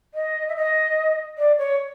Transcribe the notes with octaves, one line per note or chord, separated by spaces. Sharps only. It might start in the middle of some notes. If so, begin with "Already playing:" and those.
D#5
E5
D#5
D5
C#5